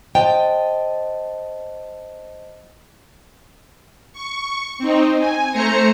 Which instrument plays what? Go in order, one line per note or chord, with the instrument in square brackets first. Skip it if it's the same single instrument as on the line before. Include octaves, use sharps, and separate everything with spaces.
[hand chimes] C5 D#5 A5 [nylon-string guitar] G5
[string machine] C#6
C4 D#4
G#5
A3 C5 A#5 C#7